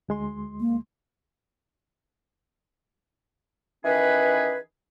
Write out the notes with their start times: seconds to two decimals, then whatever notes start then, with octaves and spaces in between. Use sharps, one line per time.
0.09 D2 G#3 C6
0.60 A#3
3.85 D#3 E3 C#4 G#4 B4